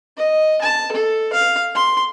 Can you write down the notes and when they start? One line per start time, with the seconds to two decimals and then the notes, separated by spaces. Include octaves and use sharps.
0.17 D#5
0.61 A5
0.92 A4
1.33 F5
1.75 C6